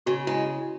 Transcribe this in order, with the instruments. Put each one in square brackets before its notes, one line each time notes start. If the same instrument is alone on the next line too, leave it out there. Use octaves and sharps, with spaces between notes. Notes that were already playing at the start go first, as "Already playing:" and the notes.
[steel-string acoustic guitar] C#3 [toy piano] F#4
[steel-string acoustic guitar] G#3 [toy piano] E4